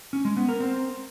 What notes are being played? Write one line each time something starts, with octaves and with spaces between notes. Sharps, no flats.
C#4
G#3
B3
A#4
C4